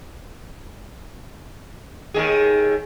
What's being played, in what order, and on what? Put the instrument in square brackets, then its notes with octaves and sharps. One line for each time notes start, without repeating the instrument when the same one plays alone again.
[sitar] D#2 D#3 G#4